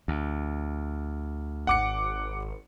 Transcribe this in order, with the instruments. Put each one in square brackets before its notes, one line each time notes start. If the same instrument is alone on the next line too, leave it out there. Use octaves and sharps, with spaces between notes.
[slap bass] D2
[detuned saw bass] G#1 [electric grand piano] F#5 D6 C#7